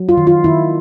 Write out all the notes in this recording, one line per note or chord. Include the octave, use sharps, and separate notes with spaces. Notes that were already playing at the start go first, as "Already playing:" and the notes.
Already playing: F#3
F4
D#3
F4
D#3 E4